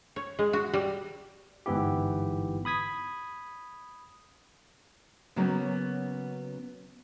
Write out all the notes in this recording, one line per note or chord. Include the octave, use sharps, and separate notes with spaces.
C#5
G#3
F#4
G3
G1 G#2 E3 B3 E4 G4
B5 D#6 G#6 B6
C#3 F#3 A#3 B3 C#4